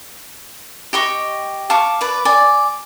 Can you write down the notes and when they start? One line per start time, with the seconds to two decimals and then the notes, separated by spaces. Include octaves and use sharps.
0.93 G4 D#5 C#6
1.70 F5 A5 C#6 D6
2.01 B4 D5
2.25 D5 G#5